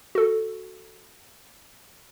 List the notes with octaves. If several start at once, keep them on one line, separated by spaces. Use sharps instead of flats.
F#4 A4